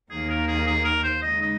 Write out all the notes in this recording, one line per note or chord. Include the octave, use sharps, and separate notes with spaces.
D#2 D#3 A#3 G#4
A#4
G#4
G#4
A#4
C5
C#3 G#3 D#4 D#5
D#5